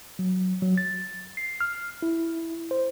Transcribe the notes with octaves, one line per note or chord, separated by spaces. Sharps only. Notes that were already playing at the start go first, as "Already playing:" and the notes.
F#3
F#3
A6
C7
F6
E4
C5